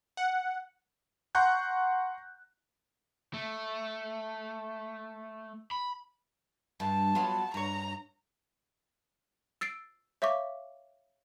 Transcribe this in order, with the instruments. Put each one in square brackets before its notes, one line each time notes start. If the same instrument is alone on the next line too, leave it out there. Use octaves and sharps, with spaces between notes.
[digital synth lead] F#5
[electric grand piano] F#5 A#5 C6 C#6 F#6 G6
[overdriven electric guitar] A3
B5
[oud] G2 [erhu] A5
[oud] F#3 B3 F4
[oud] G2 C#5 [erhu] A#5
[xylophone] E6 A6 C7 D7
C#5 E5 F5 C#6 D6